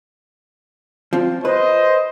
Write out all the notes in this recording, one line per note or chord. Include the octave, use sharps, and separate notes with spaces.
F3 C4
B4 C5 D#5